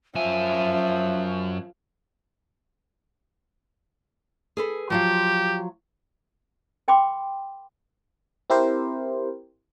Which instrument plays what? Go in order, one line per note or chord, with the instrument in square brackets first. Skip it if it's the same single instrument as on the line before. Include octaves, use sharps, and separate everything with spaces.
[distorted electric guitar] F#2 G#5 [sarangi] F3 [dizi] E5
[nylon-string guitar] G#4 A4 B4
[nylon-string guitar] F3 F#3 F4 [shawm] G4
[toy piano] A#4 G5 B5 C6 D6
[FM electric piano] C4 E4 G4 A#4 C5